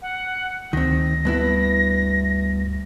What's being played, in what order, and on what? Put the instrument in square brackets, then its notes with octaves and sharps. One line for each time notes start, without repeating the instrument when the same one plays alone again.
[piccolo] F#5
[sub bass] D2 [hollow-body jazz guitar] D#3 C4 [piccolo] A#6
[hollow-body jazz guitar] G2 B3 E4